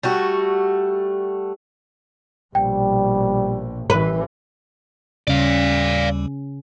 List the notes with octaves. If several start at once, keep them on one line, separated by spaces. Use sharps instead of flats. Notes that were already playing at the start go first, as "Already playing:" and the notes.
G3 A3 F#4
A#1 B2 G3 G5
A1 E3 B4
D#2 C#3 G3 C#4 D5 F5